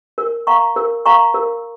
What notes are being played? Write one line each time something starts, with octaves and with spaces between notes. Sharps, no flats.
A#4
F5 A#5 C#6
A#4
F5 A#5 C#6
A#4